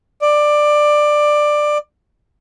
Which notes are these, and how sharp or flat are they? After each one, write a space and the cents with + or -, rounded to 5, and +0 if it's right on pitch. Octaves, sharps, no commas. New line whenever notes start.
D5 +15